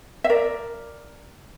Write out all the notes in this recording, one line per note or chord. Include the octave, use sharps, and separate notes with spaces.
E5
A#4 D5